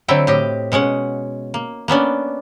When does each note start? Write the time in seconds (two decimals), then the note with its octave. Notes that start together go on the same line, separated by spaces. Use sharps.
0.08 D3 F#3 C4 E4 G5
0.27 A2 G4 D#5
0.72 B2 G#3 C#4 F#5
1.54 A#3
1.88 A#3 B3 C#4 D4